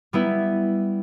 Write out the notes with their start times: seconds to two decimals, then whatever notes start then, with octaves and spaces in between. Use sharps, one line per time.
0.13 G3 B3 E4